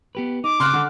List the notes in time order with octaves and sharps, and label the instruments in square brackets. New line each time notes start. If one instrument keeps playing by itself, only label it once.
[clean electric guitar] B3 G4 B4
[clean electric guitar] D#4 [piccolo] D6
[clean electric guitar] C#3 [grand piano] C6 F6 F#6
[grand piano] D3 [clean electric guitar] A4